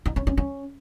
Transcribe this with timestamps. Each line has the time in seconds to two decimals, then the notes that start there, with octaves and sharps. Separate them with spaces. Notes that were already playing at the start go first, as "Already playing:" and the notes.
0.06 D#4
0.16 C#4
0.27 C#4
0.37 C#4